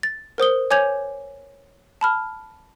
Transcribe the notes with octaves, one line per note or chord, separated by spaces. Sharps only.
A6
A#4 C5 D#6 G7
C#5 G#5 D6 G6 G#6 F7
A5 B5 F6